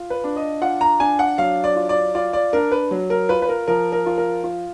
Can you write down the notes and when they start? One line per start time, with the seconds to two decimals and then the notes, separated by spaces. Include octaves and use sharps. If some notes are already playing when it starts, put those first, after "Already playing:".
Already playing: F4
0.10 B4
0.24 D4
0.36 D#5
0.62 F4 F#5
0.81 A#5
1.00 D4 G#5
1.19 F#5
1.38 F#3 F5
1.64 D5
1.76 F4
1.89 D5
2.15 F4 D5
2.33 D5
2.53 D4 A#4
2.72 B4
2.91 F#3
3.10 A#4
3.29 F4 B4
3.42 B4
3.49 A#4
3.68 F3 A#4
3.92 A#4
4.06 F4
4.18 A#4
4.44 F4